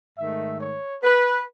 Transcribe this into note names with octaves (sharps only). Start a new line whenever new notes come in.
G#2 D#3 A3 E5
C#5
B4